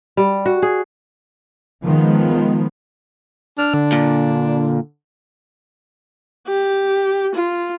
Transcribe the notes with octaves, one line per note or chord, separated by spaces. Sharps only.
G3
F#4
G#4
D#3 F3 G#3 B3
D4 F6
D3
A#2
G4
F4